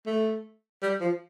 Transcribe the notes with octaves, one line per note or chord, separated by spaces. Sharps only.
A3
G3
F3